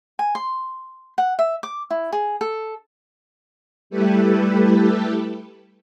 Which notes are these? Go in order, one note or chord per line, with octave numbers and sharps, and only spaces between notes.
G#5
C6
F#5
E5
D6
E4
G#4
A4
G3 A3 E4 G4 A4 B4